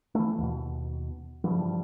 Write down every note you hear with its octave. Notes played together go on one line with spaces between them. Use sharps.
E3 A3
D#2 B2
G2 C#3 E3 F3